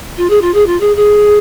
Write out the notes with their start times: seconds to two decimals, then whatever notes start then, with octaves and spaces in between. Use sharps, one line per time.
0.17 F4
0.29 G#4
0.41 F4
0.54 G#4
0.66 F4
0.80 G#4
0.96 G#4